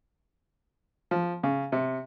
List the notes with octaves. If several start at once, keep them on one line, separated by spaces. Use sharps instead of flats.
F3
C#3
C3